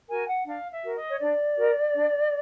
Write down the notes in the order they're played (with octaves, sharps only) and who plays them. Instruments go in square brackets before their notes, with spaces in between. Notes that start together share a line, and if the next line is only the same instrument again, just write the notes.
[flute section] F#4 A#4 G#5
F#5
D4 F5
E5
F#4 A#4
D#5
C#5
D4 D5
F#4 A#4
D4